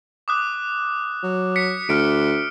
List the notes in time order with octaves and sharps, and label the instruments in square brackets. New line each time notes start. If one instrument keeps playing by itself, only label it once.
[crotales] D6 D#6 F#6
[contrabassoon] F#3
[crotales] B6 C#7
[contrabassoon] D2 [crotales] F6 B6 D7